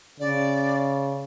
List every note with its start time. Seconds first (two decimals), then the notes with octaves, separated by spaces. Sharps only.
0.20 C#3 D5